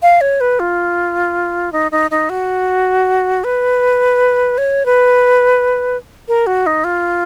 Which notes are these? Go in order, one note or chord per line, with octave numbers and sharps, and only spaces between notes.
F5
C#5
B4
F4
D#4
D#4
D#4
F#4
B4
C#5
B4
A#4
F#4
D#4
F4